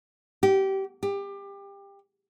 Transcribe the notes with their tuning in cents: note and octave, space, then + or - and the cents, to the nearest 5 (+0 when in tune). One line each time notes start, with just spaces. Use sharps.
G4 -20
G4 +25